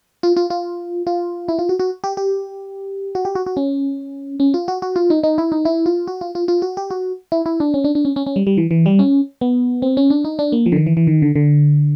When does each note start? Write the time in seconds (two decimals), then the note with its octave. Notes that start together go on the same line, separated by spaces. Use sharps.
0.23 F4
0.37 F4
0.50 F4
1.07 F4
1.48 E4
1.59 F4
1.69 F#4
1.79 F#4
2.04 G4
2.17 G4
3.15 F#4
3.25 G4
3.35 F#4
3.46 F#4
3.57 C#4
4.40 C#4
4.54 F4
4.68 F#4
4.82 F#4
4.96 F4
5.10 D#4
5.23 D#4
5.38 E4
5.52 D#4
5.65 E4
5.86 F4
6.07 F#4
6.21 F4
6.35 F4
6.48 F4
6.62 F#4
6.77 G4
6.91 F#4
7.32 E4
7.46 E4
7.60 D4
7.74 C#4
7.84 D4
7.95 D4
8.05 C#4
8.16 C#4
8.26 C#4
8.36 G3
8.47 G3
8.57 E3
8.71 E3
8.86 G3
8.99 C#4
9.41 B3
9.82 C4
9.97 C#4
10.10 D4
10.25 D#4
10.39 D4
10.52 A#3
10.66 F3
10.72 D3
10.76 D#3
10.87 E3
10.97 E3
11.07 D#3
11.22 D3
11.36 D3